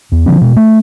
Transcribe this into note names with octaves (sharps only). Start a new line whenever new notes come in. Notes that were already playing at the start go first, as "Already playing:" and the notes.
E2
D3 F3 C4
B2 G#3
A3